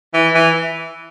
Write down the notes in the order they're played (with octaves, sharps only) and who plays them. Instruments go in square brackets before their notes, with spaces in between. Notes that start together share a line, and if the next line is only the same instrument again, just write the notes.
[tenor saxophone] E3
E3